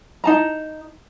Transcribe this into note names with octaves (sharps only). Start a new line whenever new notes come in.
D#4 A5 A#5